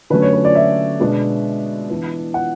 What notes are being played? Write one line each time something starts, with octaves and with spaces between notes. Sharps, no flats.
D3 F#3 A3 C#4 B4
C#5
B4
D5
E5
B2 G#3 B3 D4
E3 B3 D4
F#5